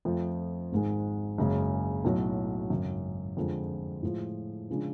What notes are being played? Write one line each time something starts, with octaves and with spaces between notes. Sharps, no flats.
F2 F3 A3
G#1 G#2 G#3
F#1 F#2 C#3 G#3
B1 A2 F#3
G#1 F#2 C#3
F2 D3 F3 G#3
A2 F3 G#3
C#3 F3 G#3 D4